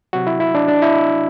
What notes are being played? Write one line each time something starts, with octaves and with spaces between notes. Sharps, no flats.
C3 F#3 F#4
E4
E4
D4
D4
E4